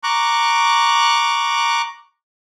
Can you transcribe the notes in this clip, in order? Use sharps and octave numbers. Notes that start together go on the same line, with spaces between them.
A#5 C#6 D6 F#6